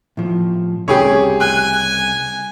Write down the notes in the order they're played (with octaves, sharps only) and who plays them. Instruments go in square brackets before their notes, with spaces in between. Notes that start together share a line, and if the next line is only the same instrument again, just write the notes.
[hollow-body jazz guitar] A2 F3
[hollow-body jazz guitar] C2 C#3 B5 [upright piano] G4 G#4 C#5
[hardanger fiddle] G#5 [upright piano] F#6